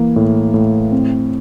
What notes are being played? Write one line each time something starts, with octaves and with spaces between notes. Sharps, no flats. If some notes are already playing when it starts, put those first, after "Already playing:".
Already playing: E3 A#3
A2
A2
C4